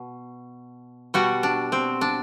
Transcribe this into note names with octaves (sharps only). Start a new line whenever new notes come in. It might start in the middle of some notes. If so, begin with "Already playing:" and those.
Already playing: B2
B2 G3 F#4
D4
C4
D4